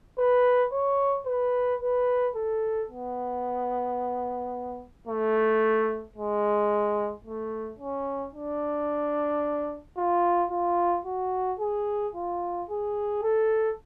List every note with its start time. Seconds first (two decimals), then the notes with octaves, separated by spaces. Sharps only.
0.18 B4
0.72 C#5
1.26 B4
1.81 B4
2.36 A4
2.90 B3
5.07 A3
6.16 G#3
7.25 A3
7.79 C#4
8.33 D4
9.97 F4
10.51 F4
11.05 F#4
11.59 G#4
12.14 F4
12.69 G#4
13.23 A4